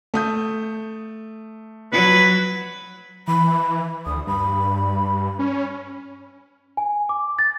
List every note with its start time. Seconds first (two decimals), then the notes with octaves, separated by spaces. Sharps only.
0.14 A3 D#6 G6
1.93 F#3 B4
3.28 E3 B5
4.06 D2 D#6
4.27 G2 B5
5.39 C#4
6.77 G#5
7.09 D6
7.39 A6